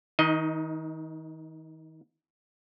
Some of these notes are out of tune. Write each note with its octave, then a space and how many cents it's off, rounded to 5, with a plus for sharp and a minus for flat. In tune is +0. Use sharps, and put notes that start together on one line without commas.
D#3 +35 D#4 -5 D#5 +10